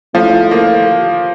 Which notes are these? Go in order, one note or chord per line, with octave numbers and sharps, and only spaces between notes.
A2 F3
A#3